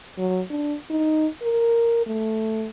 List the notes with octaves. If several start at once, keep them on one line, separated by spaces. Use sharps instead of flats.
F#3
D4
D#4
A#4
A3